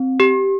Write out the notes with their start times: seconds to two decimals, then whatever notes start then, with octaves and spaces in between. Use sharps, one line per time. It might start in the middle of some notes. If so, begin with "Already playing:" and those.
Already playing: C4
0.20 G4